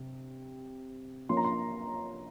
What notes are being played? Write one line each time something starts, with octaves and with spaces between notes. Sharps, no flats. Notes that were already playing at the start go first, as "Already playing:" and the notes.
Already playing: C3 C4
F3 A#3 C#4 C6
A#5
C6